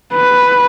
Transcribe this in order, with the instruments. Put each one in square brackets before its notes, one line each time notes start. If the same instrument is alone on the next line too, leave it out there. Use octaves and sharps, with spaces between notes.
[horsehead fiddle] B4